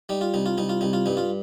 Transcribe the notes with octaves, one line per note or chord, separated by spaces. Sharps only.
G3 D#4
F4
C2 D#4
F4
C2 D#4
F4
C2 D#4
F4
G2 D#4
F4